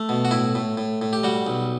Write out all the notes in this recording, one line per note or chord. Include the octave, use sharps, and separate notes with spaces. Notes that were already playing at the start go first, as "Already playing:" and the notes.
Already playing: A3
B2
F#4
A2 E4
A2
A2
A2
G4
G3 F#4
B1